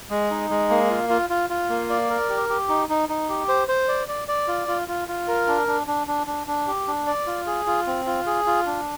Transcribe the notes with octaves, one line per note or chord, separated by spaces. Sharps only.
G#3
D#4
G#3
A#3
F4
F4
F4
F4
A#3
D5
A#4
G4
G4
D#4
D#4
D#4
G4
C5
C5
D5
D5
D5
F4
F4
F4
F4
A#4
D4
D4
D4
D4
D4
D4
G4
D4
D5
F4
G#4
F4
C4
F4
G#4
F4
D4